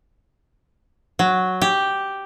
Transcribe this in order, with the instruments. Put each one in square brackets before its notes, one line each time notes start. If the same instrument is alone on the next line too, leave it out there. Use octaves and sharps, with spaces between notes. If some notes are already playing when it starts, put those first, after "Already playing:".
[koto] F#3
G4